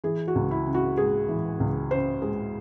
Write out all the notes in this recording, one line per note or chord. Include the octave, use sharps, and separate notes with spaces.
E3 G#4
F#4
C#2
E4
C#3
F#4
G#3 G#4
E3
C#2
C#3 C5
G#3